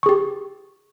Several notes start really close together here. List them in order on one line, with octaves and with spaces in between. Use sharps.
C#6 G#4 G4